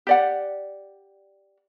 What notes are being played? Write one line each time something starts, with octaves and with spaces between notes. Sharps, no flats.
G4 D5 F#5